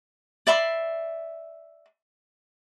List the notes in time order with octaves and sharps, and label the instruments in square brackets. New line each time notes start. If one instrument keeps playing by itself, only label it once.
[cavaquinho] D5 E5 B5 C6